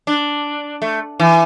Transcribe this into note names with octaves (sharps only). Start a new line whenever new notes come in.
D4
A3
E3